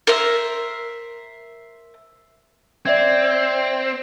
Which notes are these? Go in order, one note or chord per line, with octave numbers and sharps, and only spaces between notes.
A#4 C5 E5
C4 D5 E5 G#6